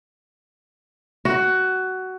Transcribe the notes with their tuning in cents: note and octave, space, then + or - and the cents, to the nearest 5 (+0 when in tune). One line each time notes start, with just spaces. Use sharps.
F#4 +15